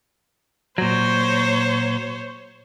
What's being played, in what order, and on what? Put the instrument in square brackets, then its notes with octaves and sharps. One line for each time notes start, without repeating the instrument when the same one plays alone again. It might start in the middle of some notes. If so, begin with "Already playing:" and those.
[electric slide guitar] A#2 F#3 [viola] C5 C#5